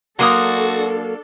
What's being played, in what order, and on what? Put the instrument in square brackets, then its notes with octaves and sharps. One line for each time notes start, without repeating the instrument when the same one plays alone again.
[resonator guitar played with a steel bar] F#3 A#3 [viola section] D4 A4 [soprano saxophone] F#4 [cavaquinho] C6 D#6